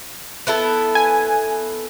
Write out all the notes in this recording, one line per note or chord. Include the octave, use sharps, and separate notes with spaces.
B3 E4 A4
G#5